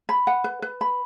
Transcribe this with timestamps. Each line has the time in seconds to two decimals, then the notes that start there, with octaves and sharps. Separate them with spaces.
0.09 B5
0.27 F#5
0.44 B4
0.62 B4
0.81 B5